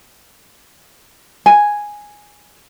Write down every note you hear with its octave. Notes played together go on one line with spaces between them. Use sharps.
G#5